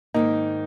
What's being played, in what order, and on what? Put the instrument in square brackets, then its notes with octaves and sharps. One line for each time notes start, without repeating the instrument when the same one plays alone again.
[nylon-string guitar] G#2 D#3 A#3 [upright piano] D#4